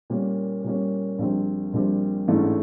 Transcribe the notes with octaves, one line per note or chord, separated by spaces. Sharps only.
A#2 G3 A#3 C#4
A#2 G3 A#3 C#4
A#1 A#2 G3 C4
A#1 A#2 G3 C4
A1 G#2 E3 A3 D4